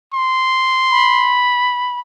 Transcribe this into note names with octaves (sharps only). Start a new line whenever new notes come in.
C6
B5